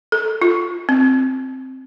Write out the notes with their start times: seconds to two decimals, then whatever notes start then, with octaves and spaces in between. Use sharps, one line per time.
0.12 A4
0.42 F4
0.89 C4